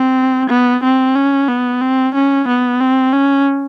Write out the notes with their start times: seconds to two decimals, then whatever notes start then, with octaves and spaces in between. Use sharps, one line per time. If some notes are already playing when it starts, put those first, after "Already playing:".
Already playing: C4
0.50 B3
0.83 C4
1.15 C#4
1.48 B3
1.81 C4
2.14 C#4
2.48 B3
2.81 C4
3.13 C#4